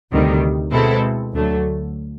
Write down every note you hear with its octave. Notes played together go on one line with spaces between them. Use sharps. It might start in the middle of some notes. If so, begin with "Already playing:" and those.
D2 C3 D#3 G3
B2 G#3 C4 E4 A4
D2 D3 F#3 A3